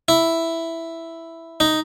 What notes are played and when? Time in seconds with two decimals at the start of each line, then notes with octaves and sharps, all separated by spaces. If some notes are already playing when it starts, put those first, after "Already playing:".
0.08 E4
1.60 D#4